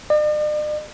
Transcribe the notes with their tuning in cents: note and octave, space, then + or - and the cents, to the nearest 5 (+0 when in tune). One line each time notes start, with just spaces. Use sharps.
D5 +45